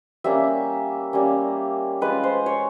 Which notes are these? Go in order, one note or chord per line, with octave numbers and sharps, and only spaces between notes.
G3 A#3 C#4 E5
G3 A#3 C#4
G#3 C#4 F4 B4
C5
C#5